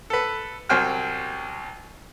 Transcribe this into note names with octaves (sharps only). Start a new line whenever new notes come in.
A4 B4
C2 F#3 C5 G5 G#5 F6